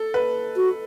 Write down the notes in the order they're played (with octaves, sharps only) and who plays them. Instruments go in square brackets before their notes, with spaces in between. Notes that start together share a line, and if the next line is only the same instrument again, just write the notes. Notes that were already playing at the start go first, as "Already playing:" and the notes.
Already playing: [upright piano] A4
B4
[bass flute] F#4